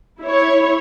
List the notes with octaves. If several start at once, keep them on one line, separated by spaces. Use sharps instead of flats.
E4 C#5